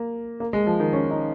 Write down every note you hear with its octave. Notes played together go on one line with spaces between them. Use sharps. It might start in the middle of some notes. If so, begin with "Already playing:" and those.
Already playing: A#3
A#3
G#3
F3
D#3
C#4
D#4